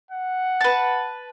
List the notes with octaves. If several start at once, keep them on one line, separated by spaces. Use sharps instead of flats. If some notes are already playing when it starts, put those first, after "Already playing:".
F#5
B4 A5